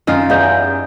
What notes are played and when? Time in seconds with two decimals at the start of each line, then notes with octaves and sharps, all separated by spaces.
0.07 F#2 D#3 D#4 F4
0.30 E2 D#4 G4 F5 G6